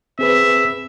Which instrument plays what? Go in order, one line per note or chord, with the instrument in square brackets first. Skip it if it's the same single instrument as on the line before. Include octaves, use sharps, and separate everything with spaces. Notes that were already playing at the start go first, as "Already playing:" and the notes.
[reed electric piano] C4 G#4 B4 [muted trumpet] E5